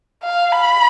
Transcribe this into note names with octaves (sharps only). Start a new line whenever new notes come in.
F5
B5